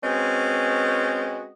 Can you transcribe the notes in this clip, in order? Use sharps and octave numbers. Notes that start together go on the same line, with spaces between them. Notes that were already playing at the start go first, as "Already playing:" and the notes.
G#3 C4 C#4 F#4 B4 D#5